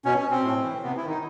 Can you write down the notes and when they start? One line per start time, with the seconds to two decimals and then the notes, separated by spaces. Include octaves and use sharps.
0.05 B2 C#4
0.18 C#4
0.31 C4
0.44 A2
0.63 E3
0.83 C3 B3
0.97 E4
1.04 D#3
1.09 D#4